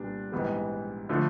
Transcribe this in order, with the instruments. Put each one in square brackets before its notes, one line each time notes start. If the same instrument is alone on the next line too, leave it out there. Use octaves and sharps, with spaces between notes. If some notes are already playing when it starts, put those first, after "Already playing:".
Already playing: [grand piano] C2 A#2 G3 B3 D4
A#1 G#2 E3 G3 B3
D3 F3 A3